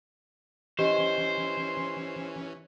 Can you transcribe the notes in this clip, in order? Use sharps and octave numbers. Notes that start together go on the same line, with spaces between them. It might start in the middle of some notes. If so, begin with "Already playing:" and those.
E3 C#4 G4 C5 D#5